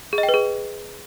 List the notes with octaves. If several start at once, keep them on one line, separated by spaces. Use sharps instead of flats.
G#4
D#5
G5
B4
G#4